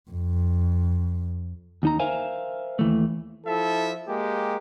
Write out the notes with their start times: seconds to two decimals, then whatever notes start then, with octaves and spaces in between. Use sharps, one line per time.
0.11 F2
1.83 D#2 D#4 A#5
1.99 A#4 C5 E5 F5 G#5
2.79 D#2 E3 A3
3.46 F3 E4 A4 E5
4.08 G#3 A#3 G4